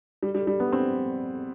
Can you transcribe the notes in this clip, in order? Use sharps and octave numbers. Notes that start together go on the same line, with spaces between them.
G3
G3
G3
B3
C4